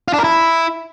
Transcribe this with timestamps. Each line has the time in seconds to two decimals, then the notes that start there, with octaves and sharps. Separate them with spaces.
0.08 F4
0.13 D4
0.19 A#4
0.24 E4